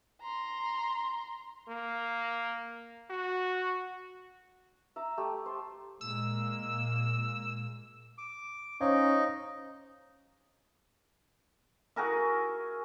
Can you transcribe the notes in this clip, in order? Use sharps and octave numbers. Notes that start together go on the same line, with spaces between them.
A#5 C6
A#3
F#4
E5 A#5 D6
A3 G4
C5 A5
A#2 G#3 A#3 E6
D6
C#4 D#4 C5 C#5 D#5 F5
F#4 G#4 A#4 E5